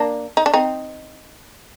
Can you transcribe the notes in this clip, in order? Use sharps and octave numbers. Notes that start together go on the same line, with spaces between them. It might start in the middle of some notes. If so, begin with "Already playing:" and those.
Already playing: A#3 D4
D#4
D4
C4 D#4